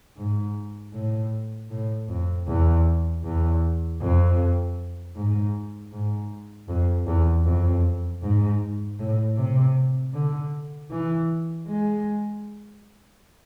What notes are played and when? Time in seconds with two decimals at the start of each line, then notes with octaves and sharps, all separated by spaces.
0.17 G#2
0.94 A2
1.70 A2
2.08 F2
2.48 E2
3.24 E2
4.01 F2
5.16 G#2
5.92 G#2
6.68 F2
7.07 E2
7.45 F2
8.22 G#2
8.99 A2
9.37 C3
10.14 D3
10.90 E3
11.67 G#3